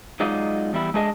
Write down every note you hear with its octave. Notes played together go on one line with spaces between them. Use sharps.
F#3 G#3 D#4 F4 D5 D#5
E2 G3 E4
G#3 A3 D4 G#4 D#5